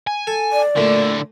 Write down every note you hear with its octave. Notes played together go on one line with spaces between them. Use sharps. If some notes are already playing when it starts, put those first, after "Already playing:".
G#5
A4
D5
A#2 D3 A3 E4